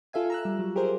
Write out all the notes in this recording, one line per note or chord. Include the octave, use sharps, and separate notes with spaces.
F4 A4 E5 F5 G#5
A#5 E6 F#6
G3
F#3
G4 G#4 A#4 C5